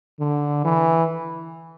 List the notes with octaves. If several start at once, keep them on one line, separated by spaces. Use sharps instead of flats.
D3
E3